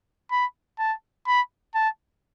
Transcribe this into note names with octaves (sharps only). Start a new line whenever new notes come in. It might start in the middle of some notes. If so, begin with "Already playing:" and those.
B5
A5
B5
A5